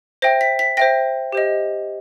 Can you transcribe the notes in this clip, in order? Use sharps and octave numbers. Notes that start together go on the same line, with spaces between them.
C5 E5 G5 A#6
B6
B6
C5 E5 G5 A#6
G4 C5 D#5